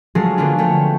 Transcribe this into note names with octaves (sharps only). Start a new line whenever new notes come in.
F3 F#3 G#3 A3 C#4 G#4
D3 A#3 B3 D4 F4
A3 G#4 C#5 G5